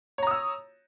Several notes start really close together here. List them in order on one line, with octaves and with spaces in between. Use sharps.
C#5 A#5 D#6 E6